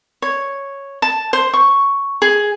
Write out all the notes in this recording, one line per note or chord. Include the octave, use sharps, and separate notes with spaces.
C#5
A5
C5
C#6
G#4